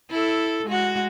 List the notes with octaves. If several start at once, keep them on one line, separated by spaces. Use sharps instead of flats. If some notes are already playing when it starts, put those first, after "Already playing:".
E4 A4
G#3 F#4